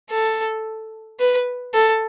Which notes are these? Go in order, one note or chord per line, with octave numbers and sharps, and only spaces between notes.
A4
B4
A4